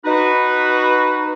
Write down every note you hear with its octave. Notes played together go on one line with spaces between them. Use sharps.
D#4 F#4 B4